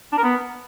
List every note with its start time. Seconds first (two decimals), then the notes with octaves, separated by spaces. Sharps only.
0.13 D4
0.18 A#4
0.23 B3